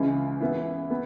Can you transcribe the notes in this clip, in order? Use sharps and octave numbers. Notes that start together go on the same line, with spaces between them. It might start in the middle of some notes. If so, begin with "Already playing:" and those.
Already playing: C#2 C#3 E3 G#3
E3 B3 E4
B3